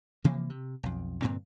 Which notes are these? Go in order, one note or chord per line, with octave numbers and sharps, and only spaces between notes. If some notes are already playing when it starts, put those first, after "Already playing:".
C3 E3 F3 A#3
C3
B1 F2
G2 A#2 D3 C4